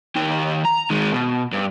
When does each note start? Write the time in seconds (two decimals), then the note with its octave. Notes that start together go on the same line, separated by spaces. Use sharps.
0.16 D#3 G4
0.65 A#5
0.90 D#3 G#3
1.12 B2
1.52 G2